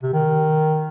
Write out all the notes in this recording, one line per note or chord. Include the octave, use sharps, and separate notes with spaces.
C3
D#3